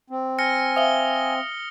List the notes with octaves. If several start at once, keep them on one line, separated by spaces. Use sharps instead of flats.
C4
G#5 F6 A#6 C#7
C5 E5 F5 D#6 G7